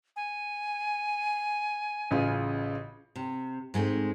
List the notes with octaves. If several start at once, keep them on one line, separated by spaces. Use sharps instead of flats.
G#5
A1 C#3 F4
C3
G#2 G#3 A3 C4